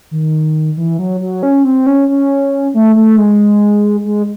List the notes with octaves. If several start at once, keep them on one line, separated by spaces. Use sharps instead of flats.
D#3
E3
F#3
F#3
C#4
C4
C#4
C#4
A3
A3
G#3
G#3